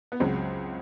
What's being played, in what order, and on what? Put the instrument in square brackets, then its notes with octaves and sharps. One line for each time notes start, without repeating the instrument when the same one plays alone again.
[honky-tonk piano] B3
C#2 C#3 F#3 C4